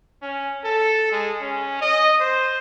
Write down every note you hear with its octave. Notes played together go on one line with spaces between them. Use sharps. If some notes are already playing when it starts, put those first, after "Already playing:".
C#4
A4
G#3
C#4
D#5
C5